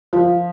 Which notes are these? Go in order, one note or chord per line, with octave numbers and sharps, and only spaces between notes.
F3